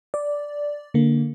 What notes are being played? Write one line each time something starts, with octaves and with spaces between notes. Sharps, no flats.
D5
D3 A#3